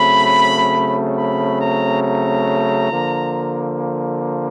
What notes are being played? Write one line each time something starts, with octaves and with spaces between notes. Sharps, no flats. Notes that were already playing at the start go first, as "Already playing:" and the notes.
Already playing: C#3 F#3 A3 C4 B5
B5
A#5
A#5
D3 F3 A#3